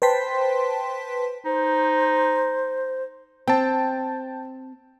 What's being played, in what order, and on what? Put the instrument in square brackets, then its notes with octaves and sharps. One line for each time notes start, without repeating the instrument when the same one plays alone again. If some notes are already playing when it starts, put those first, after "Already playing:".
[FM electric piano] B4 C5 G5 A5 C6 B6
[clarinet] D#4 [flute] C5
[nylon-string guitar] C4 [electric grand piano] G5 A5